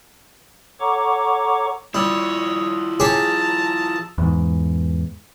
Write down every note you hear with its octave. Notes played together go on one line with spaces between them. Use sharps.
A4 C#5 F#5 A#5 C#6 D6
F3 G3 E4 C#5 D#6 E6
G4 G#4 C#5 A5 A#5
E2 G#2